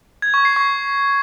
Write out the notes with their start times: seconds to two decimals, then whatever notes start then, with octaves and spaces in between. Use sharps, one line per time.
0.22 G#6
0.34 C#6
0.45 C7
0.56 C#6